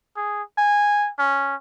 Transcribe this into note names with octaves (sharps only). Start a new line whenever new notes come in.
G#4
G#5
C#4